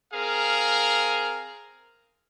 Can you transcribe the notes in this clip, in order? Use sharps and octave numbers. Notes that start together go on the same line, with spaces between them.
C4 G#4 A#4 F5